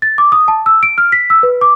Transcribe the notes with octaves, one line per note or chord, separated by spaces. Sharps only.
A6
D6
D#6
A5
E6
D7
F6
B6
E6
B4
D6